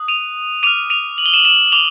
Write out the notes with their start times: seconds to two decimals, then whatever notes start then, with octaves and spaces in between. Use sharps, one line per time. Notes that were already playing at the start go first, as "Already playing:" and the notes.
Already playing: D#6 F#6
0.08 D#7 F7
0.63 D6 F6 D#7 F7
0.90 D#7 F7
1.18 F#7
1.26 G7
1.34 E7 F#7
1.45 E7 F#7
1.72 D6 F7 G7